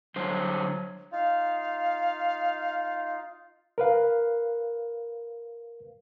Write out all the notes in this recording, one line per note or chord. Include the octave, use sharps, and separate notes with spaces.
D3 F#3 G3 C5
D#4 F4 F5
A#4 B4 F5